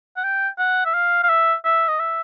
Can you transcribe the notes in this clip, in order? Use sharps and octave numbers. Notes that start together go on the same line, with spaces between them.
F#5
G5
F#5
E5
F5
F5
E5
E5
D#5
E5